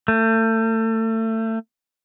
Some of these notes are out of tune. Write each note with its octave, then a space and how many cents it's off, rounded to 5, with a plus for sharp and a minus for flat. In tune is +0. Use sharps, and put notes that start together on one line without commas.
A3 +30